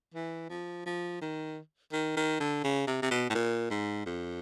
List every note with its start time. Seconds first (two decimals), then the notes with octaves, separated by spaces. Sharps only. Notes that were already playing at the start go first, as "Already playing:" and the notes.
0.14 E3
0.50 F3
0.86 F3
1.21 D#3
1.93 D#3
2.16 D#3
2.40 D3
2.64 C#3
2.87 C3
3.02 C3
3.10 B2
3.30 A2
3.35 A#2
3.70 G#2
4.06 F2